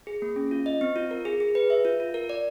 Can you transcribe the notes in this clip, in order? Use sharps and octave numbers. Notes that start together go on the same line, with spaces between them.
G#4
A#3
C#4
F4
D#5
C4
F4
A#4
G#4
G#4
B4
E5
F4
F4
A#4
D5